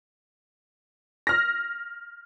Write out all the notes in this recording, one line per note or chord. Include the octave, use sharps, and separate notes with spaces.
F6 A#6